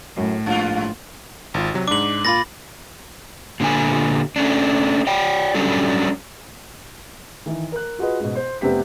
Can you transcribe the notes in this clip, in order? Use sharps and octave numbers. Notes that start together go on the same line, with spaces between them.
F#2 A2
A#1 G2 F4
G#1 F4
C3 F#3
G#2 D4 D6 F#7
A#2 F4 B5 A6 A#6
A#2 D3 B3 G#5
A3 C#4 D4
C#5 D5 G5
F#3 G3 C#4 D4 A4
D#3 E3
A#4 F#6
F4 F#4 G#4 B4 D#5
G#2 B2
C5 C6
F1 C3 B3 G4 B6